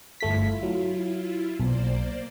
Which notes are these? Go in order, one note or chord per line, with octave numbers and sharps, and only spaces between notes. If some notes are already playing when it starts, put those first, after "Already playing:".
G1 A3 E4 F4 B6
F#3
B1 A#3 C5 D5